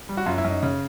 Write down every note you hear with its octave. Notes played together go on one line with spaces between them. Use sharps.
G3
F#4
F#2 F4
E4
F#2
D#4
C#3